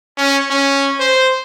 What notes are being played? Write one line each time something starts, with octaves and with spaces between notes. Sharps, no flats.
C#4
C#4
C5